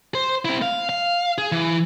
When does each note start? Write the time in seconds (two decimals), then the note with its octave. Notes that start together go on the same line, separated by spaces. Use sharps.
0.15 C5
0.45 C4 E4
0.62 F5
0.89 F5
1.38 G#4
1.52 E3